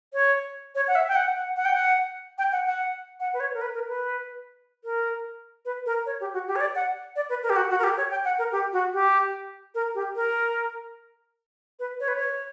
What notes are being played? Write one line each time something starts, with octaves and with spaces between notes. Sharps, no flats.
C#5
C#5
F#5
E5
G5
F#5
F#5
F#5
G5
F#5
G5
F#5
F#5
F#5
B4
C#5
A#4
B4
A#4
B4
A#4
B4
A#4
C#5
G4
F#4
G4
C#5
D5
F#5
D5
B4
A#4
G4
F#4
F#4
A#4
G4
C#5
G5
F#5
A#4
G4
F#4
G4
A#4
G4
A#4
B4
C#5
B4
C#5